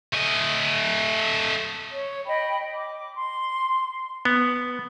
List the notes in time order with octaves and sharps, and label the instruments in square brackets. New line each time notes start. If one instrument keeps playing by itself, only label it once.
[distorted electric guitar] A3 D#5
[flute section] C#5
D#5 G5 B5
D6
C6
[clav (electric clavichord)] B3